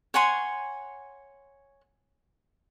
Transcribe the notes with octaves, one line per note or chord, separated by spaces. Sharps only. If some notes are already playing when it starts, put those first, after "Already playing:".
C#5 F#5 G#5 C6